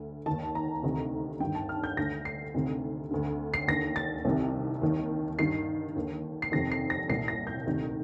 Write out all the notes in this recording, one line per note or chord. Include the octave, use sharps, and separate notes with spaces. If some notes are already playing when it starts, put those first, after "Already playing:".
Already playing: D2
D#3 A5
D#2
A#5
D2 C3 D#3
G2 D#3 G5
A5
F6
G6
D2 D3 A#6
C7
D2 C3 D#3
D2 D3
C7
D#2 D3 A#6
A6
C2 C3 D#3
D#2 D#3
G2 D#3 C7
D#2 D3
C7
F2 C3 D#3 A#6
C7
A#6
C2 A#2 C7
A#6
G6
D2 C3 D#3